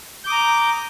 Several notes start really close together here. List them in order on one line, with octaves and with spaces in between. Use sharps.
G6 D6 D#6 A#5